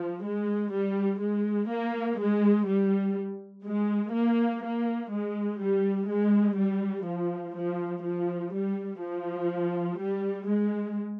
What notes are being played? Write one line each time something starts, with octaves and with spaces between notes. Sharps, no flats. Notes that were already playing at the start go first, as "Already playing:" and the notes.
Already playing: F3
G#3
G3
G#3
A#3
G#3
G3
G#3
A#3
A#3
G#3
G3
G#3
G3
F3
F3
F3
G3
F3
G3
G#3